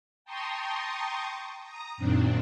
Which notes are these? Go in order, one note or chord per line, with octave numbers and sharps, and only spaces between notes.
G5 A5 A#5 C6 C#6 D#6
A#5 D#6
F#2 A#2 D#3 C4 D4